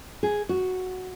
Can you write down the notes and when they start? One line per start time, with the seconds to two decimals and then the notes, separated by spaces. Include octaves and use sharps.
0.23 G#4
0.49 F#4